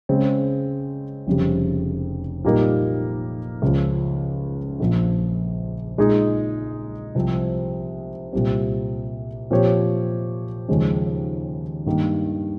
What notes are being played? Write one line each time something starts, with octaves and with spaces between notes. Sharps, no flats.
C#3 G#3 C4
F1 F2 C#3 G3
A#2 G3 A#3 D#4 A#4
C#2 C#3 F3
A#1 A#2 F3
A#2 G#3 D#4 G#4
C2 C3 F3 C4
C2 A#2 G3 C4
A#2 F3 C4 G4 C#5
D#2 C#3 F3 G#3 C#4
G2 D#3 A#3